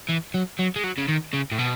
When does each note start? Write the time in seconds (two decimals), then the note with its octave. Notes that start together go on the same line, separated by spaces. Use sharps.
0.09 E3
0.34 F#3
0.59 F#3
0.76 G#3
0.84 F#3
0.98 C#3
1.09 D#3
1.33 C#3
1.52 A2
1.58 B2